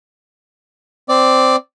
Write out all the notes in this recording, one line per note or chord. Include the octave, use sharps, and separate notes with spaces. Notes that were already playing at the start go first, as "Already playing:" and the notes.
C4 D5